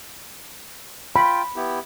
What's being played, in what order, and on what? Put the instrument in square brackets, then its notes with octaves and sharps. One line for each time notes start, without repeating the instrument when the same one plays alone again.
[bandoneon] F4 G5 [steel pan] B5
[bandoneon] B3 E4 G4